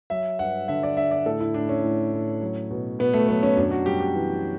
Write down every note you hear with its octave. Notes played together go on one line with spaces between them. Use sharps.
F#3 E5
G2 F#5
D3 E5
D5
D3 E5
D5
A2 A4
E4
A2 D4
C#4
A2
A2
F#3
B2
B2 B3
A3
F#3 B3
C#4
F#2 D4
F#4
G3 G4
G4
E3